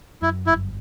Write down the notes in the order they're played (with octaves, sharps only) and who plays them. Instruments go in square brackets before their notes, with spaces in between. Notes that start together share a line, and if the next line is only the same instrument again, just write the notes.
[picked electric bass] F#2 [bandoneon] E4
[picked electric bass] G1 [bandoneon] E4